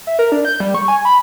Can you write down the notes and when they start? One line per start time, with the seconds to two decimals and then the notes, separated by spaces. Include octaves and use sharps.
0.07 E5
0.19 A#4
0.32 D4
0.45 G6
0.60 G3
0.74 C#6
0.88 G#5
1.05 B5